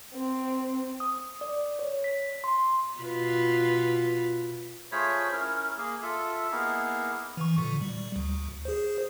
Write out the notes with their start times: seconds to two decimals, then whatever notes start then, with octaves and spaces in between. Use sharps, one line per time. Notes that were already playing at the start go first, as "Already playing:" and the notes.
0.13 C4
1.00 D#6
1.41 D5
1.79 C#5
2.04 B6
2.44 C6
3.00 B2 F4 B4
4.92 A3 F4 G#4 C5 C#5 B5
5.32 C#4 E4 A#4
5.78 A#3 G#4
6.02 F4 A4 E5
6.52 A#3 B3 D#4 E4 G#4 A#4
7.37 E3 C#6
7.58 A#2 D3
7.81 G3
8.16 D2
8.65 G#4 C5